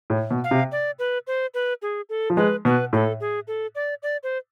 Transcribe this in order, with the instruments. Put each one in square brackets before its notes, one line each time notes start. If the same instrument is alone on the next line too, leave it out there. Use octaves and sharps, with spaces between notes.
[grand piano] A2
B2
[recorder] F5
[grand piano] C3
[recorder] D5
B4
C5
B4
G#4
A4
[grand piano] F3
[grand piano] G#3 [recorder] B4
[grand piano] B2 [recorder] B4
[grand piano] A2 [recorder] A4
[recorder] G#4
A4
D5
D5
C5